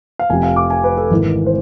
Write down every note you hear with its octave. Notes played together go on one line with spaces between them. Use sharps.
F5
F1 F2 C3 G#5
F5
D6
G#5
B4
A4
G#1 G#2 E3
C5